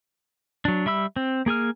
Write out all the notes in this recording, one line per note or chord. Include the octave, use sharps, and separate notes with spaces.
F#3 D4
G3 E5 B5 E6
C4
A#3 G#4 G#5 F6